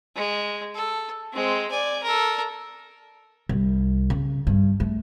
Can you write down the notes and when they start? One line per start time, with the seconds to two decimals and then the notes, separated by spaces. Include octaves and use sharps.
0.16 G#3
0.74 A4
1.32 G#3 C4
1.71 D5 G#5
2.03 A4 A#4
3.49 C2
4.10 C#3
4.47 G2
4.80 A3